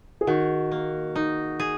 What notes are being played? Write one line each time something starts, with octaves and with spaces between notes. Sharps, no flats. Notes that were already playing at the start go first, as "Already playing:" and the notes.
G#4
D#3 F#4
A#3
D#4
G#4